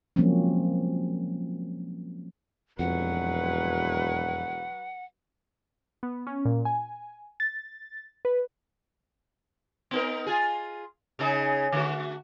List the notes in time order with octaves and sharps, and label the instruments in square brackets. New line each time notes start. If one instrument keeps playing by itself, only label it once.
[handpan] F3 F#3 G#3 A#3 C4 C#4
[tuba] E1 [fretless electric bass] F2 [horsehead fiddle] F#3 B4 [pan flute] F#5
[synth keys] B3
C#4
A#2
G#5
A6
B4
[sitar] B3 D#4 A#4
F4 G#4
C#3 D#4 G#4
D3 A3 F#4